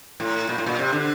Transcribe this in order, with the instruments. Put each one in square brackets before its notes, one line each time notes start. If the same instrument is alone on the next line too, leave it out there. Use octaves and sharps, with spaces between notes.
[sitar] A2
A#2
A2
A#2
C3
D3